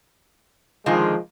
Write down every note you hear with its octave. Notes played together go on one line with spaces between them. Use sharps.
D3 D#3 F3 G#3 F4